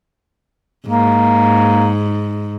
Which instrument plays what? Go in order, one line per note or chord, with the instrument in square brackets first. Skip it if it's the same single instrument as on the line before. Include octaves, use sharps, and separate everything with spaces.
[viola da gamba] G#2 [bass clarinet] A#3